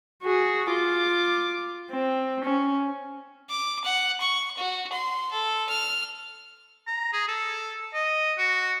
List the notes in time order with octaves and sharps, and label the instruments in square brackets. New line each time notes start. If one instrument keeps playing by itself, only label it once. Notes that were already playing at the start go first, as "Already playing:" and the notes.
[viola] F#4 G#4
F4 D6
C4
C#4
[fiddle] D6
F#5
C#6
F#4
C6
A4
F6
[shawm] A#5
G#4
A4
D#5
F#4